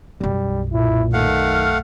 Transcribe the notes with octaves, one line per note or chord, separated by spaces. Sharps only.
B1 F#2 G3
A#2 E4
D#3 A3 F5 F#5
F6